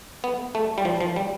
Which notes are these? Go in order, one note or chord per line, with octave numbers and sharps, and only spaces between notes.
B3
A3
G3
F3
F3
G3